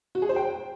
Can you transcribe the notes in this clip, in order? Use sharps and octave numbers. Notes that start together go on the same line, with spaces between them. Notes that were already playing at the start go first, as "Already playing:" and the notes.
F#4
G#4
C5
G5